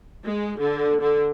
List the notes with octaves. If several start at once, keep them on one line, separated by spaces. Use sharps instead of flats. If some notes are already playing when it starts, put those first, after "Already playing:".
G#3
D3
D3